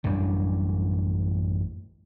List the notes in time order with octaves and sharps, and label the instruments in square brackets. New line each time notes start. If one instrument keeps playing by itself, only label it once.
[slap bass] A1 F#2 G3 D4